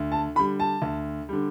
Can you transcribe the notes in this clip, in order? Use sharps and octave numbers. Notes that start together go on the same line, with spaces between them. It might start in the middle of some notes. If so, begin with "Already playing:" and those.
Already playing: D2
A5
D3 G3 B5
A5
D2
D3 G3